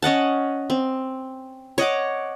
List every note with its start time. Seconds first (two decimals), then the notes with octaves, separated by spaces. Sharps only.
0.02 C#4 D#5 F#5 A5
0.70 C4
1.78 C#5 D#5 F#5 D6